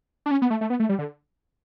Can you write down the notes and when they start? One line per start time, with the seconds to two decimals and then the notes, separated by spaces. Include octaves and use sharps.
0.26 D4
0.31 C#4
0.42 B3
0.50 A3
0.61 A3
0.70 B3
0.80 A3
0.89 G3
0.99 D3